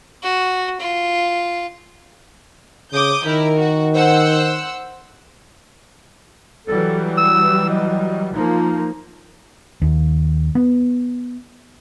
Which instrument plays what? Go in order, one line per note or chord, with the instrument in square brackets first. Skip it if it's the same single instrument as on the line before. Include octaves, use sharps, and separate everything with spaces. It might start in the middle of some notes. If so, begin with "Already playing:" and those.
[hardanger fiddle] F#4
F4
[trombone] C#3 [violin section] D6 D#6 G6
[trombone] D#3 [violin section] E4 A#4
[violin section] F#4
C5 F#5 E6
[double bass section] E3 F#3 G3 [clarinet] A4
[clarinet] E6
D#5
[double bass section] F3 A#3 [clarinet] D#4
[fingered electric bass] D#2
B3